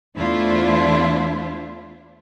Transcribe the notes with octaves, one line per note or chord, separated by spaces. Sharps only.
E2 A3 D4 E4 F4 C5